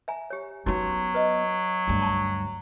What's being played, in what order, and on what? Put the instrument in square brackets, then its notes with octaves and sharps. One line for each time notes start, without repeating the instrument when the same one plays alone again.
[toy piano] E5 G#5 A#5
G4 C#5
[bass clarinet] F#3 [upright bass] B3 C#4 [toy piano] D#4 F#4 C#5
[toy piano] B4 D#5
[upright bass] D2 G2
[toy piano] A5 A#5 C#6